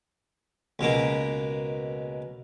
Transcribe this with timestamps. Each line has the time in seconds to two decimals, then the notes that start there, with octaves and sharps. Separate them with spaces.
0.79 C#2 B2 A#3